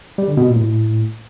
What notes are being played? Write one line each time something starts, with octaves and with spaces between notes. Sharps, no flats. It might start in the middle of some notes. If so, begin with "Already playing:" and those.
G3
D3
B2
A#2
A2